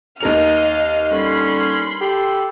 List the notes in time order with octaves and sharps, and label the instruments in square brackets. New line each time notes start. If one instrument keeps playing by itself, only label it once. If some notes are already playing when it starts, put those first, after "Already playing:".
[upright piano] D#2 A#4 F7 [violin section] D#5 F5 F6
[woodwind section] D3 G3 C#4 [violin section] B5 C6
[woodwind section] G4 A4